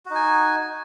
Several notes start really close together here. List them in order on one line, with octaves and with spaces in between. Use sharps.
F#4 D#4 G#5